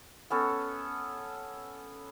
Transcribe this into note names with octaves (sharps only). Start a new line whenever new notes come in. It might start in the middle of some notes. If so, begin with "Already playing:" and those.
B3 C#4 A4